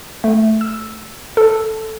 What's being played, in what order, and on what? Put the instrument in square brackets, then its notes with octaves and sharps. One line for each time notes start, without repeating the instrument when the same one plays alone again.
[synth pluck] A3
E6
A4